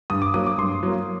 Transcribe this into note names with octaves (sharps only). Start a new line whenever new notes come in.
G2 D#6
D6
F#3 A#3 D#6
D6
G2 C6
F#3 A#3